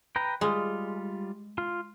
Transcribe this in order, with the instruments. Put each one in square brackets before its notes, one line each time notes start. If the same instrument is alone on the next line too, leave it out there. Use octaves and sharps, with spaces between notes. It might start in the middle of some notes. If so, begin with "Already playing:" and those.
[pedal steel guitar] B4 G5 A#5
[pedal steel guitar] G3 F4 [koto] G#3
[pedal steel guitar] F4